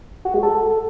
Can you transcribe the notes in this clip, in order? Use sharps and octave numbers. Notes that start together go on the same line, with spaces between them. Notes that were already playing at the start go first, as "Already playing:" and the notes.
F#4
G#3
A4